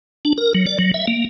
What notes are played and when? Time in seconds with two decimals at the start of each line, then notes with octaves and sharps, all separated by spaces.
0.25 D4
0.38 A#4
0.55 F#3
0.67 D5
0.79 F#3
0.94 E5
1.07 A#3